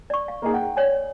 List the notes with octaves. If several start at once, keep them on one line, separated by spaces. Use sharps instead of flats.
D5 C#6
F5
A#3 D#4 G#4
F#5 G5
C#5 D5 G#5